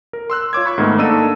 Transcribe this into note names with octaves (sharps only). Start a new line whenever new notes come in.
A#4
C6 E6 F#6
F4 C#5 D6 G#6
B5 C#6 G#6
G#2 D#3 A3 B3
A#3 D4 D#4 A4 E6 D#7